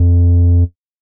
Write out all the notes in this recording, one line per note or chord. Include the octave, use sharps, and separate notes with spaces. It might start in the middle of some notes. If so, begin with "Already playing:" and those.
Already playing: F2